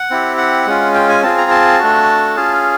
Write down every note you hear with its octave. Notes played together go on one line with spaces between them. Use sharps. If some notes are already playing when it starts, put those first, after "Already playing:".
Already playing: F#5
C4 E4 G4
F#5
G#3 C#4 F4
G5
G#5
C4 F4 G#4 A5
A#5
A5
A3 D4 F#4
C#4 F4 G#4